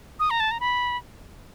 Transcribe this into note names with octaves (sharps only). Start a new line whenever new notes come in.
D#6
A#5
A5
A#5
B5